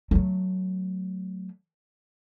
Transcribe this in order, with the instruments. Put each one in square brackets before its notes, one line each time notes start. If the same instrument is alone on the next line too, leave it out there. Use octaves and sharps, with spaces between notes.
[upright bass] F#3 A3